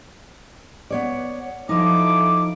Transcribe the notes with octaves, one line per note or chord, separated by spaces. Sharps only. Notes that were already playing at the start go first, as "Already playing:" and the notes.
B3 C#5 D5
F3 D#4 E4 A4 D6